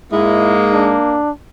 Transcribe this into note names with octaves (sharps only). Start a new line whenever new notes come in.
G#2 G#3 A#3 E4
D4